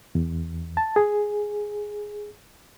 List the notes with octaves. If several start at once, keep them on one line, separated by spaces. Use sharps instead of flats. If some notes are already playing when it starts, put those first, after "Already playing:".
E2
A5
G#4